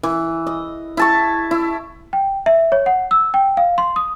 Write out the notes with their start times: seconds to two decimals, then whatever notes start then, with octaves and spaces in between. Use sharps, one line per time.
0.03 E3
0.47 D#5
0.97 E4 A5 C#6
1.51 E4
2.13 G5
2.46 E5
2.72 C#5
2.86 F#5
3.11 E6
3.34 G5
3.57 F5
3.78 C6
3.96 D#6